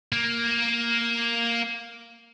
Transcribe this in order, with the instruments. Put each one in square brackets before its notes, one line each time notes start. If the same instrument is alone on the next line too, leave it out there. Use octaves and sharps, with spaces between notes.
[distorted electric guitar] A#3